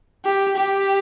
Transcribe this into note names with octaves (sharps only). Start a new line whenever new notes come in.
G4
G4